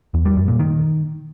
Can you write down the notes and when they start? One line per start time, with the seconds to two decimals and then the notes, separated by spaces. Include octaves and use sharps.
0.14 E2
0.25 G3
0.37 F#2
0.48 A#2
0.59 D#3